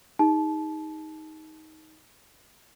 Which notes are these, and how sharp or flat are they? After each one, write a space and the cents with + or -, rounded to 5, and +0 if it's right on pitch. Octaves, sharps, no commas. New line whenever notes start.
D#4 +15 G#4 -40 A5 -25